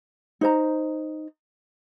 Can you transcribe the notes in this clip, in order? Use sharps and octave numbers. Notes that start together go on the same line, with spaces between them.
D#4 C5 A#5